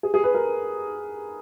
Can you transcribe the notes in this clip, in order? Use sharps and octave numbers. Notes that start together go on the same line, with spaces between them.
G#4
G#4
B4
A#4